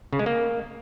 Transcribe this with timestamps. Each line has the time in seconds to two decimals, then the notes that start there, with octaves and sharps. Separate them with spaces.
0.13 C#3
0.19 G#3
0.26 A#3